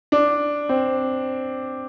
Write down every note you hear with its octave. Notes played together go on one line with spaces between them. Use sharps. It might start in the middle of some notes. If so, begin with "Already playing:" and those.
D4
C4